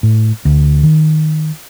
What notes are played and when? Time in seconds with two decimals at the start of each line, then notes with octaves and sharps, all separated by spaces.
0.03 A2
0.45 D2
0.83 D#3